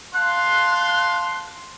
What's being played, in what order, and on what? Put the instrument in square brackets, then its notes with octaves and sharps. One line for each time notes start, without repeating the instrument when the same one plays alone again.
[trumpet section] F5 A5 C6 [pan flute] F#6